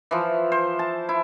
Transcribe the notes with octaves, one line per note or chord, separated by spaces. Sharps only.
E3 F3
C5
A5
E4